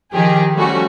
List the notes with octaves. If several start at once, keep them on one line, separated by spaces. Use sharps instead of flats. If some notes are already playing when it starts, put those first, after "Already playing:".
D#3 F3 G4 G#4
F3 G3 A3 C#4 F#4